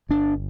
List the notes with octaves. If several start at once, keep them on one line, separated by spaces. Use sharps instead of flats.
G1 D4